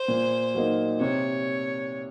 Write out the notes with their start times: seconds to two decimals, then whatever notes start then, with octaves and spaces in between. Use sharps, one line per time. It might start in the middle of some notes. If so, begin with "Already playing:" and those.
Already playing: C5
0.08 A#2
0.54 F#3 A#3 D#4
1.00 C3 C#5